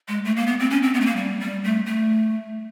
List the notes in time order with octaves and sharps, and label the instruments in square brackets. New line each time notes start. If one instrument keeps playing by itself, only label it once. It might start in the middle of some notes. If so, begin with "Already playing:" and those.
[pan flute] G#3
A3
A#3
B3
C4
C#4
C4
B3
A3
A#3
G3
G3
A3
A3